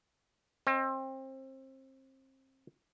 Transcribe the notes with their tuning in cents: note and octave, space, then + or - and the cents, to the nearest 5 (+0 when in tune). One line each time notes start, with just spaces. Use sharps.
C4 +30 D#5 +0